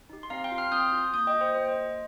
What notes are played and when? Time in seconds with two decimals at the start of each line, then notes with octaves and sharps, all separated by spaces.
0.10 D#4 G4
0.23 C6
0.30 C4 F5 A#5
0.44 G5 C6
0.51 F4
0.58 C6 F6
0.72 C4 D#6 G6
0.92 F4
1.13 A#3 D#6 G6
1.27 D#5 G5
1.34 F4
1.41 C5
1.55 A#3 C5
1.69 D#5
1.76 F4